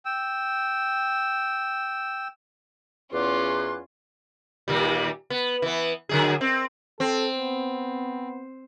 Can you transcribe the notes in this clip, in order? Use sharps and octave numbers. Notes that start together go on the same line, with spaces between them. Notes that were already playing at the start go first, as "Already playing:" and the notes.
G5 E6
E2 C#4 F4 C6 D6 F#6
D#2 A#2 G3
B3
E3 B3
D3 F#3 G#4
C4
C4 A4
B3